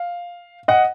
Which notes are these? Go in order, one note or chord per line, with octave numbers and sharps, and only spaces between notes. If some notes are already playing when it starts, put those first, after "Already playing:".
Already playing: F5
D#5 F#5